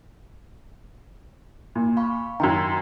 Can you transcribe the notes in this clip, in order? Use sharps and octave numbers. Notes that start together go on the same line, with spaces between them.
A#2
F5 B5 C#6
F#2 D#3 A#5 C6 G#6